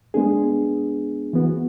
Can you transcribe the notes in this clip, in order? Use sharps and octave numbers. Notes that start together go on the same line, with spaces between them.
G#3 B3 D4 G#4
E3 B3 F#4